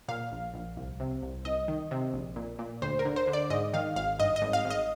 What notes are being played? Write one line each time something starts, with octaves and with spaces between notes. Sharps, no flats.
A#2 F5
A#1
A#1
C2
C3
C2
C2 D#5
D#3
C3
A#1
A#2
A#2
D2 C5
A#4
D3
C5
D3
D5
G#2 D#5
D#3 F5
G#1 F5
G2 D#5
D#5
G#1
F5
G#1
D#5